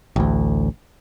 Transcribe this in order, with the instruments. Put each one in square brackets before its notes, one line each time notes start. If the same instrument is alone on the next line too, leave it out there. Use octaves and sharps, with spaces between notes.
[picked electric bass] A1 D2